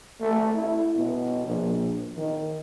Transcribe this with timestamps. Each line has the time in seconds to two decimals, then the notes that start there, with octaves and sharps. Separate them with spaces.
0.21 A3
0.54 E4
0.97 B2
1.46 A#1
2.17 D#3